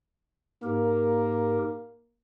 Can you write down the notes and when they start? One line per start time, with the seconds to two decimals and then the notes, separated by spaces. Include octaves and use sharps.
0.63 G#2 A#3 G4 A#4